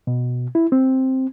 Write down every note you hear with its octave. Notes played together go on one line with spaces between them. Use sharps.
B2
E4
C4